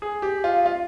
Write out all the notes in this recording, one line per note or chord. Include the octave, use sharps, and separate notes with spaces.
G#4
G4
F4
F4